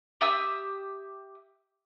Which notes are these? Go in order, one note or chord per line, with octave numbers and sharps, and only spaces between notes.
G4 E5 D#6 E6